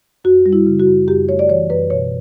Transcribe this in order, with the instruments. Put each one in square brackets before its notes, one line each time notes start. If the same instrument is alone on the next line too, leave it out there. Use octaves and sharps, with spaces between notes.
[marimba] F#2 F#4
G3
E4
C#3
F#4
F#2
F#2 G4
A3 C#5
D5
E3 C#5
F#2 B4
B2 C#5